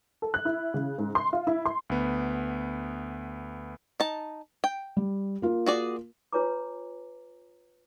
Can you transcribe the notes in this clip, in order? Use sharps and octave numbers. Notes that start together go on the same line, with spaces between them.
A4
F#6
E4
C#3
G#2
C6
F4
E4
C6
D2 B3
D#4 A5
G5
G3
A#3 F4 A#4
F#4 G#4 D5
F4 B4 C#5 G#5 A#5 D6